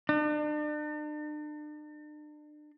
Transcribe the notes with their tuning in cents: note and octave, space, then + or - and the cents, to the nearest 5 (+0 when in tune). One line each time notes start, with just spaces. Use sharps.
D4 +40